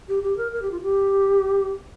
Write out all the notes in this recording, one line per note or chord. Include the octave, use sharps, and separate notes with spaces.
G4
G4
A#4
A#4
G4
F4
G4